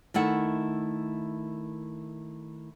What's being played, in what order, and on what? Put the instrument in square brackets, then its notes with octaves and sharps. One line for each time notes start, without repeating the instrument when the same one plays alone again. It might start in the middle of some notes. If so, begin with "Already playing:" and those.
[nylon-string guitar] D#3 A3 E4 F#5